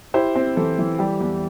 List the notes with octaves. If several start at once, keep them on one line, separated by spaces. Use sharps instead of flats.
E4 G4 C5
C4
E3 A4
E3
G3 G4
E2